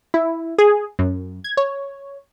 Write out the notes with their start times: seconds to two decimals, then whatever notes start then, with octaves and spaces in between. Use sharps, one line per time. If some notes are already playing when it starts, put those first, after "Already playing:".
0.14 E4
0.58 G#4
0.99 F#2
1.44 G#6
1.57 C#5